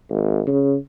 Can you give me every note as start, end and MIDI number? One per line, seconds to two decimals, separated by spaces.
0.10 0.40 32
0.47 0.75 49